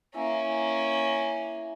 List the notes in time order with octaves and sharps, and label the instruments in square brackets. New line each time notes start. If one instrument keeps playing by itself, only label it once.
[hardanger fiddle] A#3 C#4 [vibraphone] E4 E5 G#5